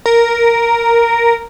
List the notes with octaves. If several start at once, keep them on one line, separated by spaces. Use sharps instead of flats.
A#4